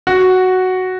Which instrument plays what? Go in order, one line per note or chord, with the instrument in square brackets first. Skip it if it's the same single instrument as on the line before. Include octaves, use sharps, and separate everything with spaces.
[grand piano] F#4